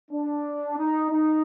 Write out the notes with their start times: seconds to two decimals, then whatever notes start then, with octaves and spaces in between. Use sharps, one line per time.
0.11 D4
0.77 D#4
1.10 D#4